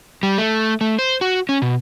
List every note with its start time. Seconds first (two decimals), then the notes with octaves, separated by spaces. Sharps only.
0.23 G3
0.38 A3
0.81 A3
0.99 C5
1.21 F#4
1.49 C#4
1.62 B2